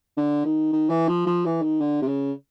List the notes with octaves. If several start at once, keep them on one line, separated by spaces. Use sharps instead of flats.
D3
D#3
D#3
E3
F3
F3
E3
D#3
D3
C3
C#3